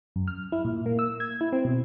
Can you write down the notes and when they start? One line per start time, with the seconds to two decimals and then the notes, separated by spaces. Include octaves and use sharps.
0.16 F#2
0.28 F6
0.52 E4
0.65 A#2
0.86 A#3
0.99 E6
1.20 G#6
1.41 E4
1.53 C4
1.65 B2